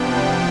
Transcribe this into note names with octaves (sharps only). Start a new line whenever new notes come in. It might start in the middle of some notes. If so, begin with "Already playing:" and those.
Already playing: C3 F3 B3 D4 G5